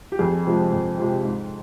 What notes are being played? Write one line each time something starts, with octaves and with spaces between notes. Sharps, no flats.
G4
F2 G#4
C3 F3 G#3
F2
C3 F3 G#3
G#2